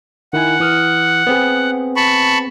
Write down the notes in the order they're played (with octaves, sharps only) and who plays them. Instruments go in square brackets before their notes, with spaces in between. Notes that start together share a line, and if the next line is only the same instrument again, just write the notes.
[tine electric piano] D#3 E4 G#5 [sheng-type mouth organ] F#5
[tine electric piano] E3 D#6 F6
B3 C4 G#4
[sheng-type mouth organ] A5 B5 C#6